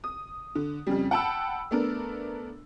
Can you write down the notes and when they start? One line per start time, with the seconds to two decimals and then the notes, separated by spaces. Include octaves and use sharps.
0.04 D#6
0.55 D3
0.87 F2 C#3 G3
1.11 F#5 G5 A5 B5 E6
1.71 A3 B3 D4 A#4